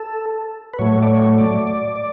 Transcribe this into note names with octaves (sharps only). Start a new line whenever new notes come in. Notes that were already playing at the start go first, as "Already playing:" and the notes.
Already playing: A4
B4
A2 F#3 A3 C#5
D5
C#5
D5
D5
D5